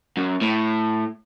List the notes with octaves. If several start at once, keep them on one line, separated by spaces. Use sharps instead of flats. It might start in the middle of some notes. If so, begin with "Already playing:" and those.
F#2
A2